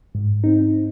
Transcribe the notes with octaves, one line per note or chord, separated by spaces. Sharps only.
G#2
C4 D#4